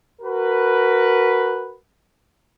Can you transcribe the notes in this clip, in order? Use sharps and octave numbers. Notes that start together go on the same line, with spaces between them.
F#4 A#4 B4